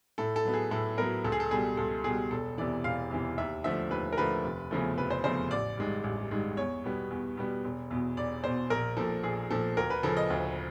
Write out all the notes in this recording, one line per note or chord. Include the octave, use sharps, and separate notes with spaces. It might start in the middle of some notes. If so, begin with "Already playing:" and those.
A2 A4
A4
F#3 B3
G#4
A2 A4
F#3 B3 A#4
C#2 A4
G#4
A4
B2 G3 G#4
C#2 A4
B2 G3 G#4
E1 A4
E2 C3 E3 D5
E1 F5
E2 C3 E3
D#2 E5
D3 F3 A3 E5
D#2 B4
A#4
D3 F3 A3 B4
F1
E2 C#3 F3 A3
F1 B4
C5
E2 C#3 F3 A3 C5
A1 D5
G2 D#3 G#3
A1
G2 D#3 G#3
E2 C#5
B2 G3 B3
E2
B2 G3 B3
E1
E2 B2
E1 D5
E2 B2 C5
A#1 A#4
A#2 F3 A4
A#1 G#4
A#2 F3 A4
D2 A#4
B4
C#3 F3 A4
D#5
D2